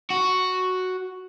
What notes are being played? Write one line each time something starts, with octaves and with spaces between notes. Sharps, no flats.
F#4